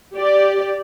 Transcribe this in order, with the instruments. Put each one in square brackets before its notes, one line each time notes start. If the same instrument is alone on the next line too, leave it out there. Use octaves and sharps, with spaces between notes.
[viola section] G4 D5